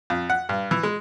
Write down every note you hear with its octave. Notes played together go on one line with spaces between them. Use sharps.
F2
F#5
G2
E3
G#3